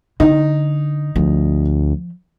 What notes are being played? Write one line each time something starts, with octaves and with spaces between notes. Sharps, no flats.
D3 D#4
D2 F3